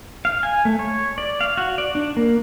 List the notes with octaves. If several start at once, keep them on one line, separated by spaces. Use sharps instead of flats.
F5
G#5
A3
C#5
D5
F5
F#4
D5
D4
A#3